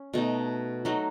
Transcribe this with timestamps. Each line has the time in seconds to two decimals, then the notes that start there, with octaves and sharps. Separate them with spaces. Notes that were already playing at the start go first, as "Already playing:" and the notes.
Already playing: C#4
0.13 B2 A3 D#4
0.85 F#3 A3 D#4 F#4